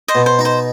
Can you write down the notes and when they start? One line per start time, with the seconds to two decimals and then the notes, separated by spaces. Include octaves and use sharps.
0.08 C5 D#5
0.15 B2
0.26 C5
0.39 D#4
0.45 C5